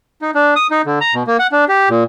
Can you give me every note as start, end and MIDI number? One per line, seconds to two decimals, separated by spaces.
0.22 0.31 63
0.35 0.54 62
0.56 0.67 87
0.71 0.82 63
0.86 0.99 50
1.01 1.14 82
1.15 1.23 47
1.27 1.37 58
1.39 1.47 78
1.52 1.65 62
1.69 1.89 67
1.90 2.04 46